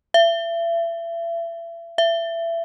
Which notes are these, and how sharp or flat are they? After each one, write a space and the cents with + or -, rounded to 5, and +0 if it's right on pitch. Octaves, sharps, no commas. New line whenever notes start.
E5 +35
E5 +25